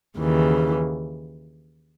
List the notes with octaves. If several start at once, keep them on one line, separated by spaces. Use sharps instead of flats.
D#2 C#3 E3